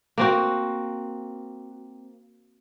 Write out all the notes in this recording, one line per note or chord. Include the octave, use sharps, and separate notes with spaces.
A#3 C4 F#4